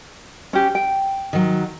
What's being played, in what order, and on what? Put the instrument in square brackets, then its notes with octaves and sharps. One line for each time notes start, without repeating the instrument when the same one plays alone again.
[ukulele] C#4 G4
G5
[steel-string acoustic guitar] D#3 F#3